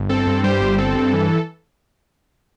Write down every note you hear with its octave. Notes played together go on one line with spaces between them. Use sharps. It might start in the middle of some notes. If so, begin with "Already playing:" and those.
Already playing: G1
C4 A4
G2
G3 G4 C5
G1
C4 A4
G2
E3